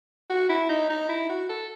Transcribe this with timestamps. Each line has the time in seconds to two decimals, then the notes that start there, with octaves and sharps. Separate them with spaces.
0.30 F#4
0.49 E4
0.69 D#4
0.90 D#4
1.09 E4
1.29 F#4
1.49 A4